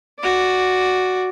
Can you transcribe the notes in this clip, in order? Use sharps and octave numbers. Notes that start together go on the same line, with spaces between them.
F#4 D5